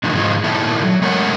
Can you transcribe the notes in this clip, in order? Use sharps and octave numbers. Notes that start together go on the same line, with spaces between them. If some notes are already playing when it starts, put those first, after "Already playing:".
A2 D3 D#3 F3
G#2 D#3 F3 G#3 E4 F4
A#2 D#3 E4 A4
F#3
G#3 A3 A#4 B4 C#5 F#5